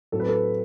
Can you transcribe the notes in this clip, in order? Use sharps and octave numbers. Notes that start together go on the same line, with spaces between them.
A2 F#3 C4 A4
B4
A4